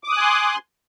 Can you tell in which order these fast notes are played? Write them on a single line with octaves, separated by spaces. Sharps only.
D6 D#6 F#6 G#5 C6